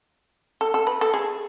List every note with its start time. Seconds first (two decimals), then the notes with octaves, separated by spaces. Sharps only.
0.61 A4
0.74 A4
0.87 B4
1.01 A4
1.14 G#4